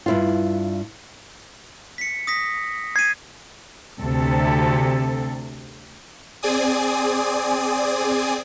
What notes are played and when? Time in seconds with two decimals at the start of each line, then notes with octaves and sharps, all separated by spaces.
0.06 G2 E4 F4
1.98 B6 C#7
2.27 D#6 A#6 B6
2.96 G#6 C7 D#7
3.99 D2 C3 A4
6.43 C4 G#4 D5 G#5 D#6